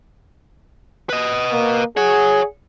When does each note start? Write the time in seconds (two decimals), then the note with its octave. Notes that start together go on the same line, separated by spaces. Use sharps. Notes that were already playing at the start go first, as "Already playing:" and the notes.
1.09 B4 D#5
1.52 A#3
1.97 G#4 C#5 F#5